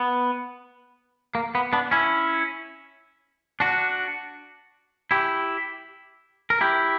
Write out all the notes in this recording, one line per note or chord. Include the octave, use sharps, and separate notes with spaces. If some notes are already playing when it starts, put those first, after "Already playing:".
Already playing: B3
A#3
B3
B3 D4
C#4 E4
D4 F#4
E4 G4
A#4
E4 G4